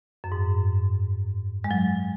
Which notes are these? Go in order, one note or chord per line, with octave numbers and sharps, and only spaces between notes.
F#2
G#2
G#3
F#3